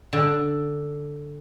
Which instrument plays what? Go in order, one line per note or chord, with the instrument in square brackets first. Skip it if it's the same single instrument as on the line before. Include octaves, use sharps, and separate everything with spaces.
[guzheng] D3